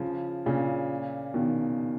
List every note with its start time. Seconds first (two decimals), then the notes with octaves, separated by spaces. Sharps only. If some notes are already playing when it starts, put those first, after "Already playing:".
Already playing: C#3 F3
0.46 A#2 C#3
1.34 B2 D#3